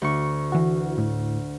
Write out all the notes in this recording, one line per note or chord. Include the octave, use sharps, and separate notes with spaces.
D2 C#6
E3 F#4
A2